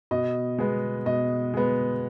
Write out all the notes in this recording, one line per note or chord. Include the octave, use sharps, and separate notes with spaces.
B2 D#5
G#3 B3
B2 D#5
G#3 B3